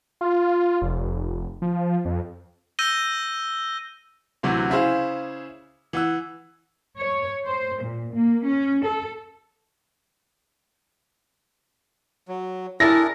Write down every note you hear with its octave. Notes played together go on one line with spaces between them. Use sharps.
F4
F1
F3
F2
E6 G6 A#6 D#7 G7
D2 C3 E3 F#3
C#3 E4 G#4 C5 F5
E3 F#5 E6
C#5
C5
A#2
A#3
C#4
A4
F#3
D4 E4 G#4 A#4 A6 A#6